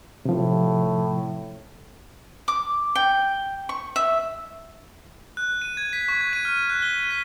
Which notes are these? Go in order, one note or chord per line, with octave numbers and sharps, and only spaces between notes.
A2 C3 F3
D6
G5
C#6
E5
F#6
D#7
G#6
B6
C#6
G#6
D#7
F6
F#6
G7
B6